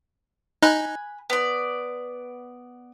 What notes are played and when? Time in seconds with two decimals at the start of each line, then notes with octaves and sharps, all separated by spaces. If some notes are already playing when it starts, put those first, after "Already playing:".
0.63 D#4 G#5 B5 F#6
1.30 B3 D5